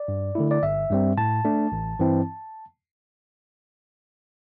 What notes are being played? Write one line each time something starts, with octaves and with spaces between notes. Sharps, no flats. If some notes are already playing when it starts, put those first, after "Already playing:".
Already playing: D5
G2
D3 A3 E4
D5
G1 E5
G2 G3 C4
A2 A5
A3 D4
A1
G2 E3 C4 E4